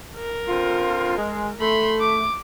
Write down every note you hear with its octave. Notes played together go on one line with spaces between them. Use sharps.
A#4
D3 C4 F4
G#3
A3 B5 C6
D6